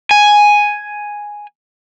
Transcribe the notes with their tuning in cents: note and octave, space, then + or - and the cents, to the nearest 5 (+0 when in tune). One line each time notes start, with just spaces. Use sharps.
G#5 +0